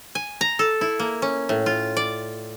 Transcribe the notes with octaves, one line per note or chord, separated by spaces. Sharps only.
G#5
A#5
A4
E4
A#3
C#4
A2
F4
D5